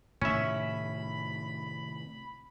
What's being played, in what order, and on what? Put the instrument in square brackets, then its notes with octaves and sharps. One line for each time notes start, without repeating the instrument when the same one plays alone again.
[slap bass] A2 C3 D#3 [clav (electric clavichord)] C#4 E5 [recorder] B5